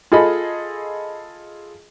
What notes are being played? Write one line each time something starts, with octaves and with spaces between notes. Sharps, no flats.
F4 G#4 A4 D#5 B5